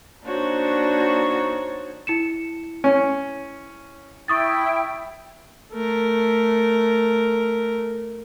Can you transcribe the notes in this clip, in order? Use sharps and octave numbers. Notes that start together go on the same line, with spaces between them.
A#3 D4 D#4 F#4 C5 C#5
E4 C#7 E7
C#4
E4 G5 C#6 D#6 A6
A3 A#4